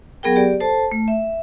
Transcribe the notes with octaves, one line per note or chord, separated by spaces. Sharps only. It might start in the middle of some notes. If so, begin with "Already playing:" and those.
F#3 B3 G#4 A#4 G5
G4 D5
A4 C5 A5
A3
E5